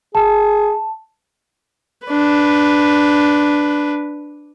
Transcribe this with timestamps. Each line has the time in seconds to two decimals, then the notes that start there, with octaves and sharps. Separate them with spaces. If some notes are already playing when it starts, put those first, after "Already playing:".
0.15 G#4 A5
2.07 D4 B4